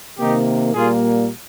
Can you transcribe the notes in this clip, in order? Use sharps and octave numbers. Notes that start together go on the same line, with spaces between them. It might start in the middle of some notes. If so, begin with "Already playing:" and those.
C3 D#3 A#3 D#4 G4
A#2 G3 A#3 F4 G#4